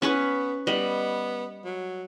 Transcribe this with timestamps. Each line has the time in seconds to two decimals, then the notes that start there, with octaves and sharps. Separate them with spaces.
0.02 B3 C#4 B4 C#5
0.67 G3 B3 D#5
1.65 F#3